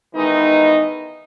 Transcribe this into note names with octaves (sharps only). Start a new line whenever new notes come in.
D#3 E3 G#3 B3 D#4